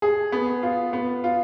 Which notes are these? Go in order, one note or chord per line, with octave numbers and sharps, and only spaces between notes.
G#4
B3
F4
B3
F4